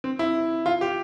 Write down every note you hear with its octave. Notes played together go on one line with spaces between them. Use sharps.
C4
E4
F4
G4